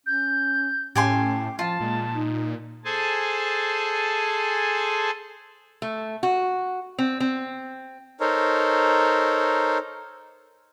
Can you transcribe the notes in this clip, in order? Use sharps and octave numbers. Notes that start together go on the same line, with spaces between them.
C#4 G6
A2 C#4 G4 G#5 A5 C6
F3 F4 A5
A#2 G#3
D#4
G#4 A4 C5 G#5 A5
A3
F#4
C4
C4
D#4 A4 A#4 C5 C#5